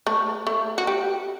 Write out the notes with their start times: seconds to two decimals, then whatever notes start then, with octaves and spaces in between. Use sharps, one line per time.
0.07 A3
0.47 A3
0.78 F#4
0.87 G4